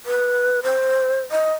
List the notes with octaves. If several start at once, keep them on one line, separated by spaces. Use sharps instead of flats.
B4
C5
D#5